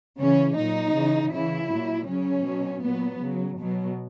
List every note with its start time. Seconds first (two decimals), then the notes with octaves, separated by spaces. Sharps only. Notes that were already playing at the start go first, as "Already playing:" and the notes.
0.19 C#3 E3 C#4
0.56 A#2 F#3 D#4
0.94 C#3 E3
1.31 C#3 E3 E4
1.69 A#2 F#3
2.07 C#3 F#3 C#4
2.45 B2 F#3
2.82 A#2 F#3 B3
3.21 C#3 F#3
3.58 B2 F#3